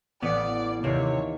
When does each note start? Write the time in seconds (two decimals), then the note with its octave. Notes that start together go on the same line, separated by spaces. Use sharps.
0.22 A1 B3 D5
0.84 D#2 C3 C#5